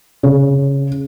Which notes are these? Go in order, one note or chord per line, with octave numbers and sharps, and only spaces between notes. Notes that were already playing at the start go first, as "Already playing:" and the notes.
C#3